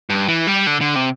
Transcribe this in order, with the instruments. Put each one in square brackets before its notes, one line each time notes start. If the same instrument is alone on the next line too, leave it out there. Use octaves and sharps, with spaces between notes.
[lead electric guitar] G2
E3
G3
D3
D3
C3